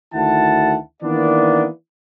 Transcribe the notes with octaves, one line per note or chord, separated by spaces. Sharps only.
D2 D#3 E4 F#5 A5
D#3 E3 A#3 B3 D4 D5